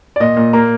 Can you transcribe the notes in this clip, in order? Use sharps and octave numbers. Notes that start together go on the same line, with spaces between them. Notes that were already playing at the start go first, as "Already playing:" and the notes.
D5
A#2 D#5
A#2
A#3 A#5